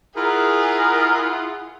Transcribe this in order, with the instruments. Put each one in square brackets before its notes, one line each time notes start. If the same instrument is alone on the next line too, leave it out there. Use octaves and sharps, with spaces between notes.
[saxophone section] E4 F4 F#5 [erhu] G#4 [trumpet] A#4